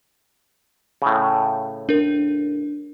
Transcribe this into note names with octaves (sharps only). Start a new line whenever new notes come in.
A2 C#3
D4 A#4